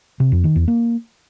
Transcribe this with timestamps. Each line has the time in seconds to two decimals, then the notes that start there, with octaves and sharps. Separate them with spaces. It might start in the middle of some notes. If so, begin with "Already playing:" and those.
0.20 C3
0.32 F2
0.44 D#3
0.56 E2
0.68 A#3